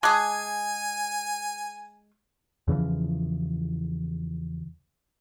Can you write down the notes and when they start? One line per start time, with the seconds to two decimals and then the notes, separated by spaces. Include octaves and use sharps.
0.03 G#3 G#4 G#5 A5 D6 F#6
2.68 E2 C#3 E3 F3